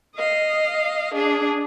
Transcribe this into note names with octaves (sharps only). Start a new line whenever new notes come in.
D#5 F5
D4 G#4